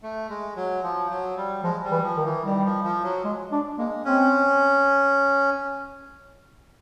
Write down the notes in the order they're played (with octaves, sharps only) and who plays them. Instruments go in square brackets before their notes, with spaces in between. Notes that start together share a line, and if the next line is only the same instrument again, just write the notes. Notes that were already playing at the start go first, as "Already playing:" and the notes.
[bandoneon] A3
G#3
F#3
F3
F#3
G3
[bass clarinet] F3 [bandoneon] G#3
[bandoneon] G3
[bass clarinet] E3
[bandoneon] F3
[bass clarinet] D#3
[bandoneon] E3
[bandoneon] D#3 [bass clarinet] G3
[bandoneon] F3
F3
F#3
[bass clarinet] G#3
D4
[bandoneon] G#3 [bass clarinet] A#3
[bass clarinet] C4 [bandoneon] C#4